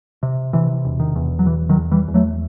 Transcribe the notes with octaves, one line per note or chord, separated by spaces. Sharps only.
C3
C3 E3
E1
D#3
E2
F#3
E1 E3
D#3 F#3
E2
E3 G3
E2
F#3 A3